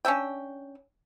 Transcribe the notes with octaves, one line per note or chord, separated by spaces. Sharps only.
C#4 D4 E5 G5